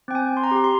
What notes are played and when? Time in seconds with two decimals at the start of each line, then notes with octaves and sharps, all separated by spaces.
0.08 C4 G5
0.15 G#5
0.29 C4
0.37 C6
0.43 A#5
0.51 G4
0.64 C6